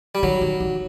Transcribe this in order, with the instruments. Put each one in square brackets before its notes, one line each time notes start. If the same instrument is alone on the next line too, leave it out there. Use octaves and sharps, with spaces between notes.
[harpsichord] G3
[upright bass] D#3 [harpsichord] F#3
[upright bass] D#3
D#3